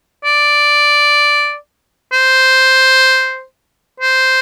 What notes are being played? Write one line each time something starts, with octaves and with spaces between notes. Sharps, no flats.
D5
C5
C5